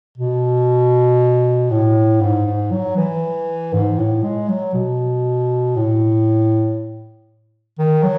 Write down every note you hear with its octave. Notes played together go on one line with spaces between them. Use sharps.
B2
A2
G#2
G#2
F#3
E3
G#2
A2
G#3
F#3
B2
A2
D#3
F#3